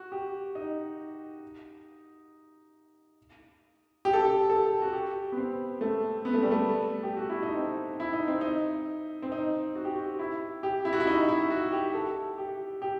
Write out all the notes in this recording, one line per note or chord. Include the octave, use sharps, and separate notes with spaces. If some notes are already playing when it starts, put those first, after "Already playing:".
Already playing: F#4
G4
D#4
G4
A4
G4
A4
F#4
G4
B3
C4
A3
B3
A3
G3
A3
G4
F#4
E4
D#4
C4
E4
D#4
C4
D#4
C4
D#4
F#4
G4
F#4
E4
G4
E4
F#4
E4
D#4
E4
F#4
G4
A4
G4
G4